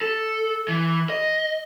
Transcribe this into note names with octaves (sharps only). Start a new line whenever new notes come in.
A4
E3
D#5